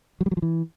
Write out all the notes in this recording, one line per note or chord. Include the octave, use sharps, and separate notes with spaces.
F#3
G3
F#3
F3
E3